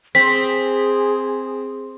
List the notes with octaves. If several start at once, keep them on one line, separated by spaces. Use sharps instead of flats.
C4 G#4 B6